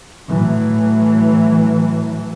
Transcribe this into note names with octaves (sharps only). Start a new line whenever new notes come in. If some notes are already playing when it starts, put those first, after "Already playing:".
A2 E3 F#3